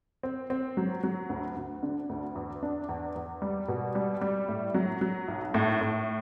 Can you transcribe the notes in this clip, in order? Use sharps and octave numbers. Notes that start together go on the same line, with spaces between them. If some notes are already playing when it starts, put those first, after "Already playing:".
C4
C4
F#3
F#3
D2
D2
D3
D2
E2
D4
E2
E2
G3
B2
G3
G3
A2
F#3
F#3
B1
A2
A2